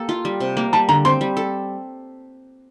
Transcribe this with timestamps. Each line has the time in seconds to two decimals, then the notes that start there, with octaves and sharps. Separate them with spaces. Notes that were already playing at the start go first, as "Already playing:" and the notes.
Already playing: A#3 G4 A4
0.09 F4
0.25 G3
0.40 C3
0.57 A#3
0.73 G3 A5
0.89 D3 A#5
1.05 C4 C6
1.21 G3
1.37 A4